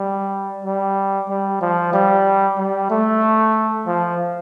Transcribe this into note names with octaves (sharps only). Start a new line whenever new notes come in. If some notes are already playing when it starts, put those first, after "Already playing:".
Already playing: G3
G3
G3
F3
G3
G3
A3
F3